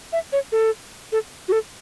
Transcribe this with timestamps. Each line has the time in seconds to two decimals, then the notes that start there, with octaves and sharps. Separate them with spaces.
0.13 E5
0.33 C#5
0.52 A4
1.12 A4
1.48 F#4
1.52 A4